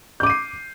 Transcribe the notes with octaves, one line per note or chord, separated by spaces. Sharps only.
D6 G6 C7 D#7